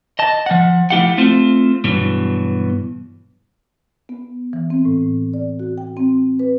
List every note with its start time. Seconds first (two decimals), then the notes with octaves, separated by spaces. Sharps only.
0.19 D#5 A5
0.46 F3 F#5
0.90 F3 A3 E4 G4 F5 F#5
1.18 A3 C4 F4
1.84 G2 B2 E3 F#3
4.09 B3
4.53 E3
4.70 C4
4.85 A2
5.34 D5
5.59 F#4
5.78 G5
5.97 C4
6.39 B4